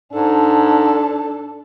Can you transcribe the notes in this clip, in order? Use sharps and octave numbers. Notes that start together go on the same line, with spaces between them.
G#2 D4 A4